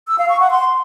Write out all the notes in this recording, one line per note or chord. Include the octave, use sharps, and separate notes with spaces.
E6
F5
C#6
F#5
C6